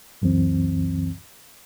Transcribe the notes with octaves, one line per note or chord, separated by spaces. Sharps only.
C#2 F#2 E3 C4